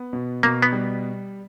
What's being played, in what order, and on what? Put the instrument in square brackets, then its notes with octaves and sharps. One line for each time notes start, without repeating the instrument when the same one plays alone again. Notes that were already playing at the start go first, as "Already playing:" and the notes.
Already playing: [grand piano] B3
B2
[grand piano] B2 [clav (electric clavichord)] A#3
[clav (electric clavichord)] B3
[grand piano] G3